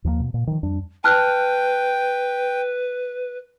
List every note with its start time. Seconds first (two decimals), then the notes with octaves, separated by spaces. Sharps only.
0.04 D#2 F3 F#3 A#3
0.20 B2
0.34 A#2
0.47 D#3 F3
0.63 F2 G3 D4
1.04 B4 G5 A5 F6 F#6